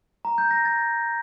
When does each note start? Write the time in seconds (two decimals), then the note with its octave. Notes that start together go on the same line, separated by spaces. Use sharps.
0.25 A#5
0.38 G6
0.51 A#6
0.65 A6